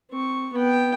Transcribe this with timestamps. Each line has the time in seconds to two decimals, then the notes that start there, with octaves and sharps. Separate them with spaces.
0.12 C4 C#6
0.53 B3 G5